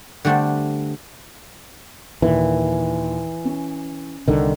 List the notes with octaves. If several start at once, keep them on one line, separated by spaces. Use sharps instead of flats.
D3 G3 A3 C4 D4
D#2 A#2 E3
C#4
C2 D3 D#3